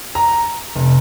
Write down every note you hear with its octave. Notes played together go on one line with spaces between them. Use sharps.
A#5
F1